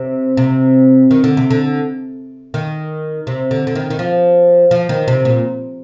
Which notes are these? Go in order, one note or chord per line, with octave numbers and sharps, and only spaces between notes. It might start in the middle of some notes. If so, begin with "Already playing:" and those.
Already playing: C3
C3
D#3
D3
C3
D3
D#3
C3
D3
D3
D#3
D#3
F3
F3
D#3
C3
A#2